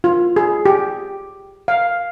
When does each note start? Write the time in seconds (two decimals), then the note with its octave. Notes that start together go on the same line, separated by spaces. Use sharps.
0.04 F4
0.36 G#4
0.66 G4
1.68 F5